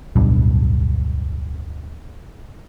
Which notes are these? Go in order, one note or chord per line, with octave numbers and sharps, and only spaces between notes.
D1 B1 G2